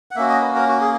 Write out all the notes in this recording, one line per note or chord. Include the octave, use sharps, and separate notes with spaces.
F#5
A#3 C#4 F#4 E5
D#5
B4
A#4
F#4
G#4